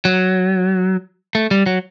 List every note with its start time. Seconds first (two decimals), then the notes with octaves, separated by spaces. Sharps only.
0.05 F#3
1.35 A3
1.51 G3
1.66 F#3